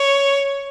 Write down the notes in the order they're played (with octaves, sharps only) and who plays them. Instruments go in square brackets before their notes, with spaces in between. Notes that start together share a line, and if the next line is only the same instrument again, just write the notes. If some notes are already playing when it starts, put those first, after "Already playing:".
Already playing: [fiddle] C#5